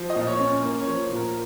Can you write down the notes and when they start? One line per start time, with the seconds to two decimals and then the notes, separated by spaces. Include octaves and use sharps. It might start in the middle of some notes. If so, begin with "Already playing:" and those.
Already playing: F3
0.10 D#5
0.16 A#2
0.27 C#5
0.39 C#4
0.62 A#3
0.80 C#5
0.87 F3
1.10 A#2
1.16 A#4